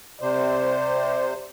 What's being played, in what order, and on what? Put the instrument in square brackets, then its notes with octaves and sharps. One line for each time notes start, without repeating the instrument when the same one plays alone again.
[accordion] C3 C5 [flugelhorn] D5